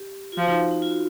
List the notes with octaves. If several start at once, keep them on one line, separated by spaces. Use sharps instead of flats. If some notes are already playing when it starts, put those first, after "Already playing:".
Already playing: G4
F4
F3 F#4
D#4
D#4
F4
F#4